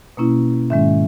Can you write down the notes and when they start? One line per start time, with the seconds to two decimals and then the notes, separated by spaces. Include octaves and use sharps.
0.17 B2 A#3 C#4 E4
0.70 G#2 D#3 G#3 C#4 E5